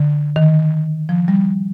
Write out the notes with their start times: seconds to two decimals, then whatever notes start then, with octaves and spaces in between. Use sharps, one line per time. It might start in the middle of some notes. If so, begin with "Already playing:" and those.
Already playing: D3
0.36 D#3
1.09 F3
1.28 G3